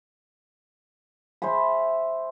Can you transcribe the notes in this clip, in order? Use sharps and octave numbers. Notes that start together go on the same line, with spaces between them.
C5 E5 G#5 B5